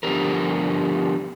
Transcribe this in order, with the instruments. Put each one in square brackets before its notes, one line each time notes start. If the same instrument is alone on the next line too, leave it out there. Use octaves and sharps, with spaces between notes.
[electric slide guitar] D3 F3 G3 B3 G4 A#4